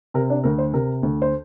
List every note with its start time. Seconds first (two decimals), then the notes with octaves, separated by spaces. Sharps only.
0.14 C3 A#4
0.30 D4
0.44 D2 A#4
0.58 C5
0.73 C3 A#4
1.03 D2
1.22 C5